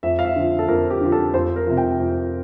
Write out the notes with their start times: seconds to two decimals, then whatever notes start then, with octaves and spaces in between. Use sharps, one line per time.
0.03 F2 E5
0.19 F5
0.25 E5
0.36 D3 F3
0.59 A4
0.68 F2 A#4
0.90 G4
1.01 D3 F3
1.12 A4
1.34 F2 C5
1.56 A#4
1.67 C3 F3
1.77 G5
2.00 F2